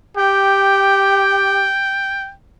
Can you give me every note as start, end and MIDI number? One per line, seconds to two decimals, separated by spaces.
0.17 1.70 67
0.17 2.31 79